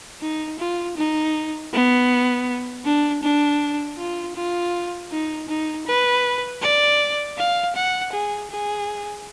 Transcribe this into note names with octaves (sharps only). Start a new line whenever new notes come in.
D#4
F4
D#4
B3
D4
D4
F4
F4
D#4
D#4
B4
D5
F5
F#5
G#4
G#4